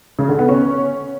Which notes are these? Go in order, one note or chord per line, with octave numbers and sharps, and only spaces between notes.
C#3
D3
B3
C#4